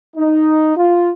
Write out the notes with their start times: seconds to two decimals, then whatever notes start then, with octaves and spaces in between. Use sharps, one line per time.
0.17 D#4
0.77 F4